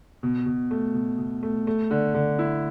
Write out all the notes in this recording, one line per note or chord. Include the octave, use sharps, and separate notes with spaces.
B2
B2
A3
B2
B2
A3
A3
D3
D3
E4